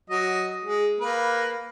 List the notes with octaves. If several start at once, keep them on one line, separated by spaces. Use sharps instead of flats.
F#3 D#5
G#3
A#3 B4